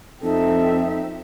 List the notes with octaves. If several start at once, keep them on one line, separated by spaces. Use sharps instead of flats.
F2 C4 D#4 A4 E5